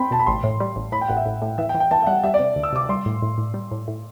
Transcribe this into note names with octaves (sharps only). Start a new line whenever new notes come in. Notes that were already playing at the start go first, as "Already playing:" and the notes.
Already playing: C4 G5 B5 C6
B2 A5
B5
A1 C6
A2
G3
A1
A2 B5
G5
A1 F#5
E5
A1
A2
E3 E5
G5
E3
G5
E3 A5
E5
G3 F#5
G3 E5
D5
C3
D2
E6
C3 D6
G3 C6
A2
A2
A2
G3
A2
A2